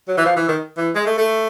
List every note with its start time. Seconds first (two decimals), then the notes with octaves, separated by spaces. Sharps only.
0.08 F#3
0.17 E3
0.25 F3
0.36 E3
0.48 D#3
0.77 E3
0.95 G#3
1.06 A3
1.18 A3